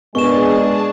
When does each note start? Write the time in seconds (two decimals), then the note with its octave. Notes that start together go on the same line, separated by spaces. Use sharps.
0.15 A#2 G#3 B3 D4 G#4 A5 C#6 E7